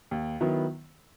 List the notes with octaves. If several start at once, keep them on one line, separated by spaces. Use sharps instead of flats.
D#2
D#3 F#3 B3 E4